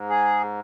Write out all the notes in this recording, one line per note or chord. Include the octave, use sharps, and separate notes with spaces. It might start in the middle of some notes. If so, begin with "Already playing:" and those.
Already playing: G#2
G#4